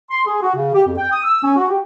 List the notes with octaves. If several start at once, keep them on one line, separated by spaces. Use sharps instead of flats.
C6
G#4
F#4
C#3
G4
F2
G5
D#6
E6
C#4
F#4
G4